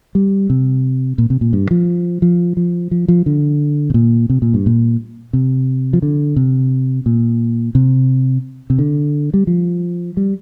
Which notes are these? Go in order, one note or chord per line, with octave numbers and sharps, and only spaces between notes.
G3
C3
A#2
C3
A#2
G2
F3
F3
F3
F3
F3
D3
C3
A#2
C3
A#2
G2
A#2
C3
F3
D3
C3
A#2
C3
C3
D3
G3
F3
G3